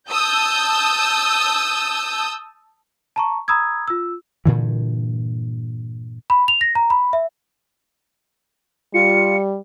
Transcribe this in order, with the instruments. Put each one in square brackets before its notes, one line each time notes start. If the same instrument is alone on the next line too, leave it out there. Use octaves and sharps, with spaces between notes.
[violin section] A5 D#6 E6 G6
[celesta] A5 A#5 C#6
A#5 B5 D#6 E6 G#6
F4 E6
[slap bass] G2 A#2 D3 E3
[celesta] B5
F7
A#6
A#5
B5
E5
[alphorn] G3 [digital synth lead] F4 [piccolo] C#7